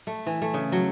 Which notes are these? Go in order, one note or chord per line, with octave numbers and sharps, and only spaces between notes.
A3
E3
A3
C#3
F#3